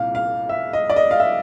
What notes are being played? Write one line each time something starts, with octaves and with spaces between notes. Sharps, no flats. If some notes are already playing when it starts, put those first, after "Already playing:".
Already playing: C2 A#2 F5
F5
E5
D#5
D5
D#5
F5
E5